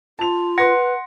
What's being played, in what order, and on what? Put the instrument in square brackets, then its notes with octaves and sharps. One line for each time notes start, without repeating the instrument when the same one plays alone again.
[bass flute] F4 [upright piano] A5 F7
[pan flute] B4 [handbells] F#5 [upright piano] C6 A#6